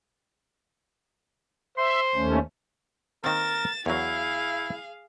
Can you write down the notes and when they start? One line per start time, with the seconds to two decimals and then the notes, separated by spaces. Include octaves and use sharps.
1.78 C5 E5 C6
2.15 D#2 A3 C#4
3.24 D#3 A#3 C4 A#4 A6 E7
3.86 E2 F#3 E4 G#4 F5